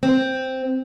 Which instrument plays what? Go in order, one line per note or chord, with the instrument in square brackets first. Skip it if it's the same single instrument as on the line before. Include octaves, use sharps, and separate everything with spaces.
[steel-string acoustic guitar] C4